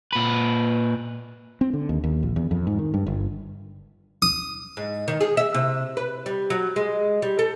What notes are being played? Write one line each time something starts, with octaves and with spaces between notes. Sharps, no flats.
A#2 B4
C4
D3
D#2
D#2
A#1
E2
F2
G#2
D#3
G2
G1
D#6
G#2
D#3
G#4
E5
C3
B4
G3
F#3
G#3
G3
A4